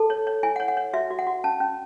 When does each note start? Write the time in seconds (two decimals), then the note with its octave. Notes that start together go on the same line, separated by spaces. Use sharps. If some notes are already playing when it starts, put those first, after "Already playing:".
Already playing: A4 A5
0.10 C#5
0.27 C#5
0.43 E4 G#5
0.56 F#5
0.60 C#5
0.68 F#5
0.77 C#5
0.93 F#4 E5
1.10 F#4
1.19 F#5
1.27 F#4
1.44 C#4 A5
1.60 C#4